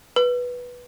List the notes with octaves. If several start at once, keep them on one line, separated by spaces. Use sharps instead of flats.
B4